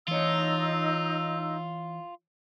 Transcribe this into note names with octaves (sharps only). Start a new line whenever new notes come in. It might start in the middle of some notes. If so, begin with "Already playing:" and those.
E3 D#4 F4 C#5 E6